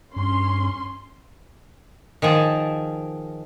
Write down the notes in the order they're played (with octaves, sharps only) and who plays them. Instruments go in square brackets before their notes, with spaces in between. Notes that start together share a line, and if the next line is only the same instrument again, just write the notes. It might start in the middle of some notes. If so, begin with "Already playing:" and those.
[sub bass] G2 [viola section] C#4 C6
[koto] D#3 F3 G#4 A5